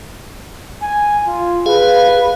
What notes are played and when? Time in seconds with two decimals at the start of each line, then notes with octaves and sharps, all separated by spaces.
0.82 G#5
1.27 F4
1.66 G#4 B4 F5